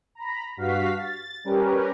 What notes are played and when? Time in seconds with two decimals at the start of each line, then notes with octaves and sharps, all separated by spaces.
0.15 A#5 B5
0.57 G2 F#4 F5 B6
0.97 A6
1.44 G3 C#4 G4 A#4 B4